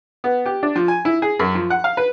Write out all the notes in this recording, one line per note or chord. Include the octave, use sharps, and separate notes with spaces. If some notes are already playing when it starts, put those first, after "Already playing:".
B3
G4
D4
F3
G#5
E4
G#4
F#2
F3
F#5
F5
B4